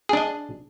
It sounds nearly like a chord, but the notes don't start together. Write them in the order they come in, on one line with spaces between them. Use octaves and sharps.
G#4 D4 D#5